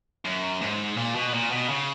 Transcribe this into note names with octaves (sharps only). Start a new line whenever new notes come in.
F#2
G#2
A#2
B2
A#2
B2
C#3